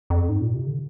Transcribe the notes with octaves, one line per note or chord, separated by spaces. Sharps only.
F2
G#2
A#2
C3
D3